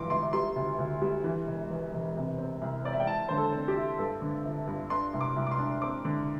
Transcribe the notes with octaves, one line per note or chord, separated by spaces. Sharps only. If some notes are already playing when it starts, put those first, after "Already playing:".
Already playing: G1 G2 E3 C6 D6
G1 C6
G3 C6
D2
D2
G3
E3
E1
E2
E1
C3
C4
C2
C4 D5
E5
G5
E4 A5
D3 C5
A4
C4
G4
E4
G2 A4
D3
G1
G2
D4 C6
C2
D6
C2
D6
C6
D4
C4 D6
D3